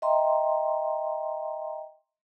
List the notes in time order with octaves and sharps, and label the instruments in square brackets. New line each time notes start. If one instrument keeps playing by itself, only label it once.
[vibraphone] D#5 E5 G5 A#5 C6